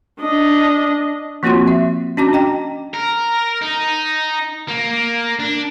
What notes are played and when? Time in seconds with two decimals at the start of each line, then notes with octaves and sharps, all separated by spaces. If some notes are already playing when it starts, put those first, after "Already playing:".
0.21 D4 D#5
1.43 F3 A#3 C4 F4 F#4 C6
1.67 E5
2.17 C#4 D4 F#4 A5 A#5 D6
2.33 D#5 G5 A#5
2.94 A#4
3.62 D#4
4.68 A#3
5.39 D4